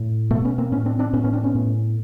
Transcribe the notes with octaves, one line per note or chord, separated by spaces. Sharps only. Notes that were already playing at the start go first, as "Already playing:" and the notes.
Already playing: A2
B2 A3 B3
B3 C#4
A#3 C4
A2 B3 C#4
C4 D4
C4 D4
A2 B3 C#4
B3 C#4
C4 D4
B3 C#4
A2